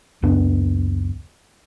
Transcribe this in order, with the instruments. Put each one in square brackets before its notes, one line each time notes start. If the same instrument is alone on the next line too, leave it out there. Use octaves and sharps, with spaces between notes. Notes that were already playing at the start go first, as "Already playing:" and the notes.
[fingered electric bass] C#2 F#2 B3 D4